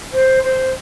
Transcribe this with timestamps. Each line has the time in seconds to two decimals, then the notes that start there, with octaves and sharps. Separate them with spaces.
0.13 C5
0.43 C5